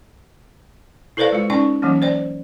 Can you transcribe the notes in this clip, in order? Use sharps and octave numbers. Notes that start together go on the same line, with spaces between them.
E4 A4 B4 C5 D5 F5
G#3 F4
C#4 D#4 D5 G5 C#6
E3 F#3 A#3 C#4
C5 D5 G5